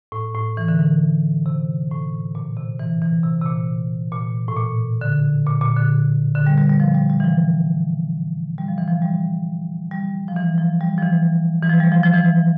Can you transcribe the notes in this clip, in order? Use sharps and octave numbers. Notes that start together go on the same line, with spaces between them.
A2
A2
E3
D3
E3
C3
A2
A#2
C3
E3
E3
C3
C3
A#2
A#2
A2
A#2
D3
A#2
A#2
D3
D3
G3
G3
G3
F3
G3
G3
E3
F3
G3
F3
E3
F3
G3
G3
F3
E3
F3
G3
F3
E3
E3
F3
G3
F3
F3
E3